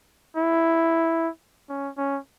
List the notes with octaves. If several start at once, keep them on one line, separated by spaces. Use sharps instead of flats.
E4
C#4
C#4